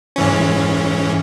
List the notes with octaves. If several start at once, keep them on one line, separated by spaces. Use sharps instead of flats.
G#2 E3 C#4